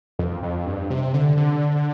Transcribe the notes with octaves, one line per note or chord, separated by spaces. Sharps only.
F2
F2
G2
C3
D3
D3